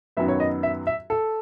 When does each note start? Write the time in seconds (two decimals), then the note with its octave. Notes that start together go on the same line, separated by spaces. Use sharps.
0.17 F#2 D#3 F#3 B3 E5
0.28 C#5
0.40 D#5
0.63 E5
0.87 E5
1.10 A4